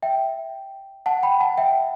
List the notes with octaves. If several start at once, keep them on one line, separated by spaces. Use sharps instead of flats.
E5 G5
F#5 A5
G5 B5
F#5 A5
E5 G5